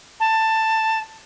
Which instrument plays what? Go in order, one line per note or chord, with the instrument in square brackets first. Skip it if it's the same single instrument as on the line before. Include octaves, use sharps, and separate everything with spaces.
[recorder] A5